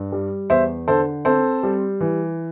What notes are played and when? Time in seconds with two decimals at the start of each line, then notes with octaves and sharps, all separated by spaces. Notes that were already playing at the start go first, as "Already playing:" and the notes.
Already playing: G2
0.12 G3
0.50 E2 C5 E5
0.88 D3 A4 C5
1.25 C4 A4 C5
1.63 G3
2.00 E3